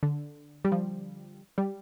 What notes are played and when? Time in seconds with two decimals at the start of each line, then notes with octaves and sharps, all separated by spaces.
0.03 D3
0.65 G3
0.72 F3
1.58 G3